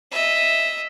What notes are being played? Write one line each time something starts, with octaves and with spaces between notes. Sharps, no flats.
D#5 E5